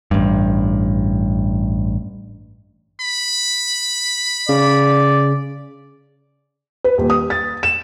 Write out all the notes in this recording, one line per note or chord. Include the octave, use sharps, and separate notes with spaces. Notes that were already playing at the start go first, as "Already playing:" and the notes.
A1 G2
B5
C#3 D5
B4
D#1
D#6
A6
E7